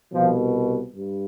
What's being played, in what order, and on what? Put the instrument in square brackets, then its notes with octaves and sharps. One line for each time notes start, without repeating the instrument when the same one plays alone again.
[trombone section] C2 B2 F3
G2